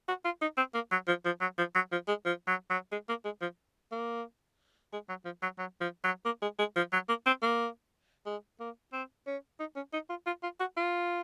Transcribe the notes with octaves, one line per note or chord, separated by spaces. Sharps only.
F#4
F4
D#4
C4
A#3
F#3
F3
F3
F#3
F3
F#3
F3
G#3
F3
F#3
F#3
G#3
A#3
G#3
F3
A#3
G#3
F#3
F3
F#3
F#3
F3
F#3
A#3
G#3
G#3
F3
F#3
A#3
C4
A#3
G#3
A#3
C4
C#4
D#4
C#4
D#4
F4
F4
F4
F#4
F4